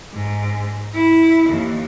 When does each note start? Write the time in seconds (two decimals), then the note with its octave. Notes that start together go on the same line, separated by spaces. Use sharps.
0.12 G#2
0.94 E4
1.49 D#2